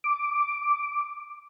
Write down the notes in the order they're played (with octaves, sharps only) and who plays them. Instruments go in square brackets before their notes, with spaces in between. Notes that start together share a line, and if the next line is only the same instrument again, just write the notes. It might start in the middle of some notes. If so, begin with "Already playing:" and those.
[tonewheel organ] D6